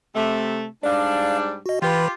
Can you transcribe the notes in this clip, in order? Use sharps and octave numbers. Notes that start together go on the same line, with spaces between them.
C3 A3
G#2 G3 D4 D5 F5
F#4 D#5
E3 F4 G4 B4 B5